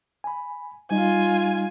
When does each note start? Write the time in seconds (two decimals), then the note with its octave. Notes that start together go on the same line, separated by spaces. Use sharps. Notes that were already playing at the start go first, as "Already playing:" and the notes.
0.24 G#5 B5
0.91 G3 D#4 F4 D#5 G#5